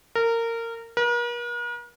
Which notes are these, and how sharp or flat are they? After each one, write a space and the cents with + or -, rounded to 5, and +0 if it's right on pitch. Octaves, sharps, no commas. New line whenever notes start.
A#4 -20
A#4 +45